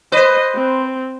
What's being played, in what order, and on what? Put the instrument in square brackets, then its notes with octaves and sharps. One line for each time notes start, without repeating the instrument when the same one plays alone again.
[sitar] B4 C5 [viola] D#5
[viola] C4